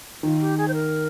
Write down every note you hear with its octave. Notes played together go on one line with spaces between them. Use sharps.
D#3 F4
G4
G#4
C5
A#4